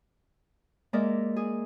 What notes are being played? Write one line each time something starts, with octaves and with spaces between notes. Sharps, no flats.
G#3 A#3 A#4 D5 E5
G#4